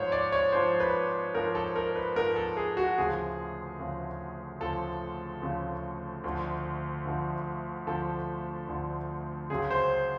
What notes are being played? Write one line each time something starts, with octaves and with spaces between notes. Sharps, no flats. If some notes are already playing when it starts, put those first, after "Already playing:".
Already playing: G#2 F3 C5 C#5
D5
C#5
G#2 F3 C5
B4
G#2 F3 A#4
A4
A#4
B4
G#2 F3 A#4
A4
G#4
F#4
D2 C#3 F3 G#4
D2 C#3 F3
D2 C#3 F3 A4
D2 C#3 F3
D2 D3 F3
D2 D3 F3
D2 D3 F3 A4
D2 D3 F3
C#2 C#3 F#3 G#4
C5